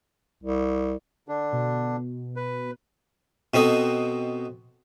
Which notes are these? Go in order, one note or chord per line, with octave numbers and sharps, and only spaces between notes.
C2
D3 D4
B2
B4
B2 C4 F#4 A4 D#5